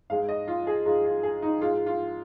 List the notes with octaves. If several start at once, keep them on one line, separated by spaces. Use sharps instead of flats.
G#2 G#3 F5
D#5
F4
G#4
G#2 G#3 F4
F4
G#4
D#4
G#2 G#3 F4
F4